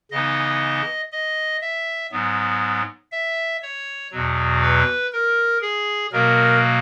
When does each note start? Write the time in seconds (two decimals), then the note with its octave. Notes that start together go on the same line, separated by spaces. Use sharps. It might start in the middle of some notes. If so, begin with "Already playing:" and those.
0.11 C#3 E3 B3 D#4 D#5
1.12 D#5
1.61 E5
2.12 G#2 F#3 B3
3.12 E5
3.62 C#5
4.11 E2 B2 F#3
4.62 B4
5.12 A#4
5.61 G#4
6.12 B2 F#3 A#3 A#4